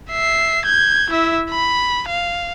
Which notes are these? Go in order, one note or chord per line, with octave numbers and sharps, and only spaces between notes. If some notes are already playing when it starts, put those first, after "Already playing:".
E5 C7
G6 G#6
E4 E5
B5
F5